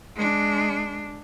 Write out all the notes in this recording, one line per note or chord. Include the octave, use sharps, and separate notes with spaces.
G#3 D4